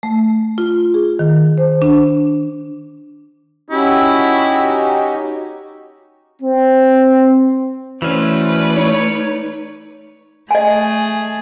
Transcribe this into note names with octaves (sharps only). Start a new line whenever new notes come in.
A3
F4
G#4
D#3
C5
D4
C#4 D#4 E4 F#4 G4
C4
E3 A3 C#4 F#4 B4 C5 D5
D#4 C#5
A3 G#4 D#5 G#5